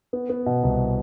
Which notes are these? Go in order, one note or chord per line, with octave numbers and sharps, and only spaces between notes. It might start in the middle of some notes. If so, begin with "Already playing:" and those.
B3
B3
B2
C2